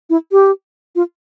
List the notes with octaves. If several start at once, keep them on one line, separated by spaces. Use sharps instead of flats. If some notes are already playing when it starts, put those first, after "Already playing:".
E4
G4
F4